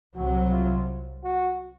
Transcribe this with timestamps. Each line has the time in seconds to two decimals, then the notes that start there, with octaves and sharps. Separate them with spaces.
0.16 C2 C3 F#3 F#4
0.51 F4
1.24 F#4